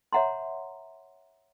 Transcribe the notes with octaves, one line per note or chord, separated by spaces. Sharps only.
C#5 E5 F#5 A#5 C6